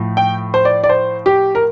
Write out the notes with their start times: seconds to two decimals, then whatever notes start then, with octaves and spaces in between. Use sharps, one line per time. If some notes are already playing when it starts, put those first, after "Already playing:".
Already playing: A2 F3
0.17 G5
0.54 C5
0.65 D5
0.84 D5
0.89 C5
1.26 G4
1.55 A#4